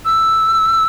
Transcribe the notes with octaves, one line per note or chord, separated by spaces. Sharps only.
E6